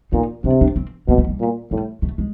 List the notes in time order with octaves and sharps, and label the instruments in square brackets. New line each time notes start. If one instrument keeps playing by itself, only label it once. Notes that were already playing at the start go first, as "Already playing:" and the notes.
[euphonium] A#2 [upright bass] D#4
[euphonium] C3 [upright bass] D4
[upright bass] D4
C4
[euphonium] B2 [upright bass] A#3
[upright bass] A3
G3
[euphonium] A#2
[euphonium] A2 [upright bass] G3
[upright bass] A3
G#3